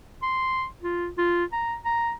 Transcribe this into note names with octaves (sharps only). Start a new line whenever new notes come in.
C6
F4
F4
A#5
A#5